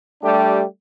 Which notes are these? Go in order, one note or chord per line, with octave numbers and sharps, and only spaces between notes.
G3 A3 D4 G4